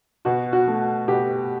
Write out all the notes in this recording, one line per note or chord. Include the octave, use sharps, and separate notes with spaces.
B2 F#4
F#4
A3
B2 G4